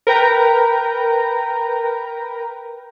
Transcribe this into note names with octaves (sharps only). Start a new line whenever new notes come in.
A#4 B4 G5 A#5